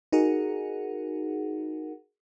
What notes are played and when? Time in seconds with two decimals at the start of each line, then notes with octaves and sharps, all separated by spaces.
0.12 D#4 F#4 G#4 A#4 F#5